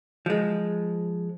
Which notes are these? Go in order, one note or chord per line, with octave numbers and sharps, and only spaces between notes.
F3 G#3